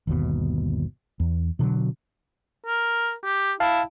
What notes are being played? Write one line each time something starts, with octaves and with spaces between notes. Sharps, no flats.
G1 D#2 B2
E2
B2 D3 F3 F#3
A#4
G4
E4 F5 A5